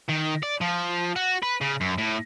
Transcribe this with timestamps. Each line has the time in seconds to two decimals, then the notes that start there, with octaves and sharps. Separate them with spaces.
0.09 D#3
0.43 D5
0.61 F3
1.16 F#4
1.43 B4
1.61 C#3
1.81 F#2
1.98 A2